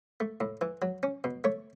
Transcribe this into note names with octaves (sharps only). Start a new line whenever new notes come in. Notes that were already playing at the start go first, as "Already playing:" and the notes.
A3
A2
E3
F#3
C#4
B2
A3 C#5